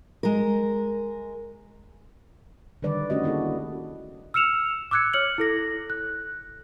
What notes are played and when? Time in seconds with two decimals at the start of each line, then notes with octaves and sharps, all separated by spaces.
0.23 G#3 A#4
2.82 D3 D#3 G3 B4 D5
3.10 A3 C#4 D4 F#4 G4 D#5
3.23 A#3 E4 F#4 G#4 A4
4.34 E6 F6 C#7 E7 F7
4.91 D6 E6 F#6 G#6 C#7
5.14 C#5 F6 C#7 F#7
5.38 E4 A4 A#6
5.90 F#6